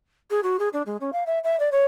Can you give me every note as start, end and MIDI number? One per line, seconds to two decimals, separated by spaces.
0.30 0.40 68
0.43 0.57 66
0.59 0.68 68
0.73 0.82 62
0.86 0.97 56
1.00 1.10 61
1.12 1.23 77
1.26 1.39 76
1.43 1.58 76
1.59 1.69 74
1.71 1.85 73